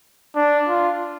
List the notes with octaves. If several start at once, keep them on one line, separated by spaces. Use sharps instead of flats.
D4
F4